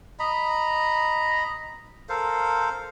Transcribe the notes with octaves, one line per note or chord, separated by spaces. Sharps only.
D#5 A#5 B5
A4 A#4 C5 F5